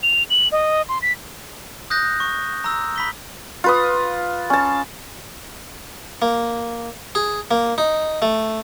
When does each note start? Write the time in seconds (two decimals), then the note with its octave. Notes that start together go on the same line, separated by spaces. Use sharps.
0.03 F7
0.30 F#7
0.52 D#5
0.89 C6
1.02 B6
1.90 D#6 F#6 G6 A#6
2.20 C#6
2.64 A#5 E6
2.96 B5 B6 G7
3.64 F4 B4 D#6
4.50 C#4 A5
6.22 A#3
7.15 G#4
7.51 A#3
7.78 D#4
8.22 A3